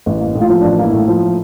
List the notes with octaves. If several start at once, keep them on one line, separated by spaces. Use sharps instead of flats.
A1
A#3
A2
F4
F3 E4
D4
A1
A#3 E4
A2
F3